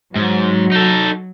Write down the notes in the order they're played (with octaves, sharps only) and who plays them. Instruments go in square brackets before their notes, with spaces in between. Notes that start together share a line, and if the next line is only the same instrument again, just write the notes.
[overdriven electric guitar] G#2 [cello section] F#3
[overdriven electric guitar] D#4 A4